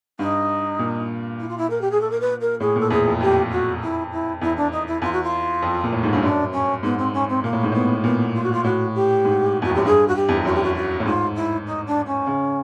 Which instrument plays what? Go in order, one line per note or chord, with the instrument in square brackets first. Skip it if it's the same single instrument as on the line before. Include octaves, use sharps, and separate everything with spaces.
[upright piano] G2 [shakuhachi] D#4
[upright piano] A#2
[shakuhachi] E4
F4
E4
A#4
G4
G#4
A4
A#4
B4
A#4
[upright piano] A2 [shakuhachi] G#4
[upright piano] A#2 [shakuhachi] A4
[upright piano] E2 [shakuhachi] G#4
[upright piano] F2
[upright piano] F2 [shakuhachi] G4
[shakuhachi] F#4
E4
E4
[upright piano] E2 [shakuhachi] E4
[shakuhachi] D4
D#4
E4
[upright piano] E2 [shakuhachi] F4
[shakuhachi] F#4
F4
[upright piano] F2
A#2
A2
G#2
[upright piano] G2 [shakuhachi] C#4
[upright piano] F#2 [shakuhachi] D4
[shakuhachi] C#4
[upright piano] G#2 [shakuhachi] B3
[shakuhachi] C4
C#4
C4
[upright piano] A#2 [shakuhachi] A#3
[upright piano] A2
G#2
[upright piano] A2 [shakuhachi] B3
[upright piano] A#2 [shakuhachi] B3
[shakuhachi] F4
F#4
F4
[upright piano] A2 [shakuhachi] F#4
[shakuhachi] G4
[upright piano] G#2
[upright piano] E2 [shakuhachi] F#4
[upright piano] F2
[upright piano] F#2 [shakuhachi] G4
[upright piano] G2 [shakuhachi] G#4
[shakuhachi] F#4
G4
[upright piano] E2
F2
[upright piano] F#2 [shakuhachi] F#4
[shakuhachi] G4
F#4
F#4
[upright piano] A2
[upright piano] G#2 [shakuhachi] F4
[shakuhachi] E4
D#4
D4
C#4
[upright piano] C#3